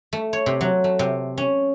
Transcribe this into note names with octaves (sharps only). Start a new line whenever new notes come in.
A3
C#5
C3
F#3
A3
C3
C#4